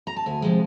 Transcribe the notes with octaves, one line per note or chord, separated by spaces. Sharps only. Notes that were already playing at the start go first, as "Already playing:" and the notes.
A#5
A5
D2 G#5
C3 F3 G#3